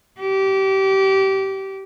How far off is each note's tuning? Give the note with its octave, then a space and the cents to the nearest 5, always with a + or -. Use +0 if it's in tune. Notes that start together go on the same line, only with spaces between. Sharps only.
G4 -25